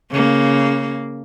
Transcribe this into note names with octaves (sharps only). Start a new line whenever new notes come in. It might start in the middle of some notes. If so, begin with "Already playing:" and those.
C#3 A#3